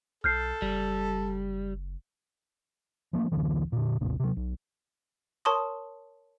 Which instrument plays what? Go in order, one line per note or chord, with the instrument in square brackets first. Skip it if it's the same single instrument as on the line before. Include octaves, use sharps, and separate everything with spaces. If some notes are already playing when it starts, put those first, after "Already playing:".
[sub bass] B1 [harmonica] A4 [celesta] F6 G6 C7
[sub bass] F#1 [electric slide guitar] G3
[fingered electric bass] F3 A3 A#3
D1 A#1 D3 E3
A#2 D3
G#1 D#2 A2 C3
C3 F#3
B1
[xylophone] A#4 C#5 A5 C6 C#6 D#6